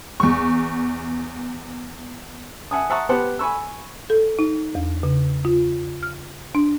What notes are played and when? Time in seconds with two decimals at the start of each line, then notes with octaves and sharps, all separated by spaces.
0.20 E2 C#6
2.71 E5 F#5 G#5 A5 D#6
2.90 E5 F#5 A5 A#5 C#6 D#6
3.09 B3 G4 B4 C5 F#5 A5
3.39 G#5 B5 C#6 E6
4.10 A4
4.39 D#4
4.75 E2
5.03 C#3
5.45 F4
6.03 F6
6.55 D4